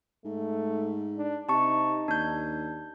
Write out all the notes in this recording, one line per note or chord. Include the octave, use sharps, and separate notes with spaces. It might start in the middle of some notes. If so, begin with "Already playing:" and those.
G#2 A3
D4
C3 D#4 A5 C#6
D#2 D4 G6